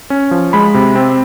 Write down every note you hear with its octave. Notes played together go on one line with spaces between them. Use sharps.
C#4
F3
G#3 B5
C3
C4